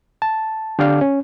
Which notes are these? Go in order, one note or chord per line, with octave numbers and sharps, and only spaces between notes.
A5
D3 G4 A4 D5 F5
C#4